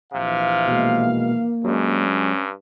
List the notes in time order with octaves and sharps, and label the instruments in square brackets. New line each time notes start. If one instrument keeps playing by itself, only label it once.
[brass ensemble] A#1 E3 F5 [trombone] C3
[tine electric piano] B2 G#3 [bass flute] A#3
[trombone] G2 [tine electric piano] F#3 G#3 [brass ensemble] C#4